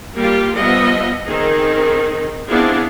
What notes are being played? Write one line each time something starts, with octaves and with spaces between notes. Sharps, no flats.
G3 A#3 F4 G4
F3 G3 B3 D#5 E5
D#3 C4 D#4 G#4
B3 C4 D4 E4 F4 G#4